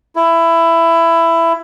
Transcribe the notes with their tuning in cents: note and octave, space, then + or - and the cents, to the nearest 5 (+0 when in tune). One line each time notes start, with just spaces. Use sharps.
E4 +15